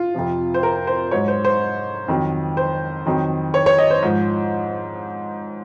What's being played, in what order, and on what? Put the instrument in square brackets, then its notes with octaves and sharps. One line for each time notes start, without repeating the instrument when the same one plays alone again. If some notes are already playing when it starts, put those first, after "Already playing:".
Already playing: [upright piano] F4
F2 C3 F3
C5
A#4
C5
G#2 F#3 C#5
C5
C5
F2 D#3 F#3
C5
F2 D#3 F#3
C#5
C#5
D#5
C5
G#2 F3